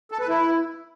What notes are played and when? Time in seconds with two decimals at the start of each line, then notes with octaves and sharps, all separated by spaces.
0.11 A4
0.20 B4
0.28 E4